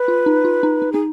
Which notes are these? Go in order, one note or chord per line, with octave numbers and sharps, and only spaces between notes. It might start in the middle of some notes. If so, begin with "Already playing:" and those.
Already playing: B4
F4
D#4
F4
D#4
D#4
D#4 G#4